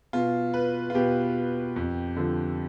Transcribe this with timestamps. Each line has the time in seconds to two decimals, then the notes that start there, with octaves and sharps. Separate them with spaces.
0.13 B2 F4
0.54 B4
0.90 F4
0.95 B2 G4
1.76 F2
2.17 D3 F3